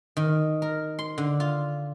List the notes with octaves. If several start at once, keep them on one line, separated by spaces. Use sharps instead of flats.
D#3
A#4
C6
D3
F4